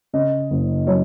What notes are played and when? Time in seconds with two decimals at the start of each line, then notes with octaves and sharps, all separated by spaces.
0.13 C#3 D#5
0.51 F#1
0.87 F#3 C#5